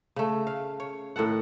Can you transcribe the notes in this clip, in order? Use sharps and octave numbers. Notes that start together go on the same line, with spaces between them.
C#3 A3
F5
C#5
A2 D#3 A4 F#5